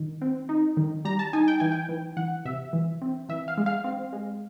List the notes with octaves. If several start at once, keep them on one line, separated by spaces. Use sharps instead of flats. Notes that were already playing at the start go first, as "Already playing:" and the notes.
Already playing: D#3
C4
D#4
D#3
G3 A#5
A5
D#4 G#5
G5
E3 G#5
G5
E3
E3 F#5
C3 E5
E3
C4
E3 E5
F5
G#3
F5
C4
G#3